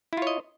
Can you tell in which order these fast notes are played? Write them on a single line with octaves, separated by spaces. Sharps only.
E4 F4 C#5 D#5